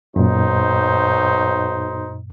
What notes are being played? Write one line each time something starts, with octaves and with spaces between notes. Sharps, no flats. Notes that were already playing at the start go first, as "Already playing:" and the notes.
B1 F#2 A#2 D#4 C5